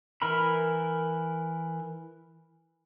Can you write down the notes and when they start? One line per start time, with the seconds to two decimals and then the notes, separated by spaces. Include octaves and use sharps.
0.22 E3 A#4 A#5 B5